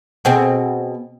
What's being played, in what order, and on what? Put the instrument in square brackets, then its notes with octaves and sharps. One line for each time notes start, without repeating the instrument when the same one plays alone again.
[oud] B2 C4 G#4